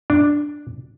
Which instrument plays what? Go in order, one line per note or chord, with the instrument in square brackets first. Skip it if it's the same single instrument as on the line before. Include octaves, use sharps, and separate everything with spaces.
[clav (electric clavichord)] D4